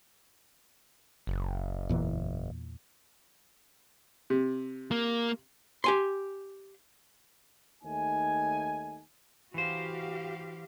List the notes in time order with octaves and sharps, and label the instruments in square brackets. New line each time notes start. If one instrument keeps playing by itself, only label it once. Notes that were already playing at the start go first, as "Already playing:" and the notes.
[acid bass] F#1
[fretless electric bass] E2 A#2 E3
[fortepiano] C3
[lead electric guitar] A#3
[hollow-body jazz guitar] G4 G#5 C6
[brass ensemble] D#2 A3 D#4 G#5
[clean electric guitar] E3 C5 [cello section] F#4 G4 F5